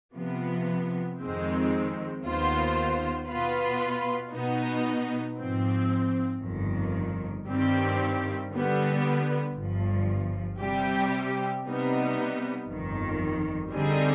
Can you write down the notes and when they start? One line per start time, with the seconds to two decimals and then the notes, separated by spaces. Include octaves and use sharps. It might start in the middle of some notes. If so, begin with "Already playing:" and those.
0.14 C3 F3 B3
1.19 F2 D#3 G#3 C4
2.24 D#2 D#3 B3 F4 C5
3.28 B2 B3 F4 B4
4.33 B2 B3 D#4
5.37 G#2 F3 C4
6.41 G1 F2 D#3
7.46 G2 D#3 G3 C4 G4
8.50 D3 G3 B3
9.55 G1 G2 F3
10.60 C3 G3 C4 G4
11.65 C3 G3 B3 D#4
12.69 G1 F2 D#3
13.73 D3 G3 C4 D#4 G#4